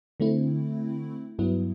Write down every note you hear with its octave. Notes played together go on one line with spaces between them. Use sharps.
D3 A3 C4 E4
G2 F#3 B3 E4